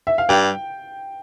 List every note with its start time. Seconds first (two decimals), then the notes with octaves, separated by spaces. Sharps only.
0.07 E5
0.18 F5
0.29 G2 G5